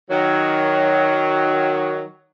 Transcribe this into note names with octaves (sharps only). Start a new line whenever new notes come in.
D#3 F#3